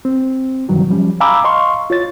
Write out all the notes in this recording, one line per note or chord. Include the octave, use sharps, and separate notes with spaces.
C4
G2 C3 D#3 E3 F#3 G3
F3 G3 C#4
F5 G#5 A#5 B5 D6 E6
D#5 F5 C6 C#6
F4 C#5 A6